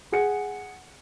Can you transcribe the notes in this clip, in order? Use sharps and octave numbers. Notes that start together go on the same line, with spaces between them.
G#4 F#5 C#7